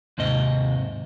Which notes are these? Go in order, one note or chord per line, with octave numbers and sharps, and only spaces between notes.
D#2 G#2 C3 D#5